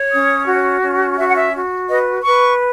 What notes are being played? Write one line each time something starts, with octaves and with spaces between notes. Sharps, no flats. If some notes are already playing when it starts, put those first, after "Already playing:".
Already playing: C#5
C#4 D#6
F#4
C#4
F#4 E5
F#5
E5
F#4
B4 D#5
B4 C#6